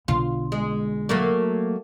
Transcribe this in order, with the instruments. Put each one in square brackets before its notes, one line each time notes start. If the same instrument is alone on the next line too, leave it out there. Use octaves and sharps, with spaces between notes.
[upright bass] B1 D3 [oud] F4
[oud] G#3
F#3 A3 A#3